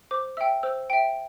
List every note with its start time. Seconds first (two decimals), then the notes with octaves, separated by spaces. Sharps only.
0.11 C5 D6
0.37 E5 G5 E6
0.63 C5 E6
0.90 E5 G5 D7